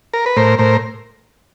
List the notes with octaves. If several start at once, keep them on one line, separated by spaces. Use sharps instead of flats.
A#4
B4
A2 A#4 C5
A2 A#4 C5